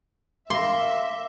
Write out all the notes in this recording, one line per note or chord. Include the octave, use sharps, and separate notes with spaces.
A#3 E5 C6 D6 A#6